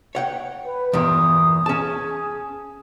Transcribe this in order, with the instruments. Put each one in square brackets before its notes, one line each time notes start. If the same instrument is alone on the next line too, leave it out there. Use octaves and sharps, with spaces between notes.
[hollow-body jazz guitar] C#5 F#5 G5
[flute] B4
[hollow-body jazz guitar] E2 G2 A#2 [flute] D#6
[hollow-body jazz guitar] C#4 A5 [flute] G#4